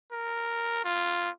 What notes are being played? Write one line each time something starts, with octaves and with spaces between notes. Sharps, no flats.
A#4
F4